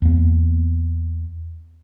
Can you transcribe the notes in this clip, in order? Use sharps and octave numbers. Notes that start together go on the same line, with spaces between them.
E2 A#3